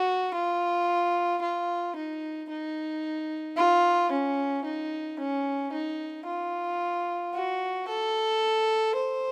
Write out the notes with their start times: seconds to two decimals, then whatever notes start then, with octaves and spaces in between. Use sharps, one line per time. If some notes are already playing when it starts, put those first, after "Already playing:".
Already playing: F#4
0.34 F4
1.42 F4
1.96 D#4
2.50 D#4
3.57 F4
4.11 C#4
4.65 D#4
5.19 C#4
5.72 D#4
6.26 F4
7.34 F#4
7.88 A4
8.96 C5